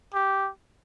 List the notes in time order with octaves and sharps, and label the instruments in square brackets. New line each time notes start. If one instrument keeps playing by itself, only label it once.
[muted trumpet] G4